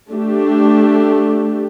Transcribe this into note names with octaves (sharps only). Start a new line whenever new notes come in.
A3 D4 G4